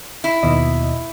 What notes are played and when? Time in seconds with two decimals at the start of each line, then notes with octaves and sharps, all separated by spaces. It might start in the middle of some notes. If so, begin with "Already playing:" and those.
0.24 E4
0.43 D#2 B2 D#5